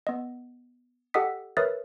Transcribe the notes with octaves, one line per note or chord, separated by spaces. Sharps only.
B3 D#5
G4 A4 D#5 F#5 D#6 B6
A#4 B4 C#5 E5 D#6 A6